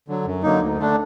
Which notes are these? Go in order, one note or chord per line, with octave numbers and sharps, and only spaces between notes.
D3 F#3
F#2
D3 F#3 A#3 D#4
D2
D3 A3 D4